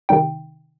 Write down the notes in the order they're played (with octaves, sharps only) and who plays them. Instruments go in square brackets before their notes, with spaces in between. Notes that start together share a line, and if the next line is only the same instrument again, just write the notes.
[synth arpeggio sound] C3 D#3 G3 D#4 G5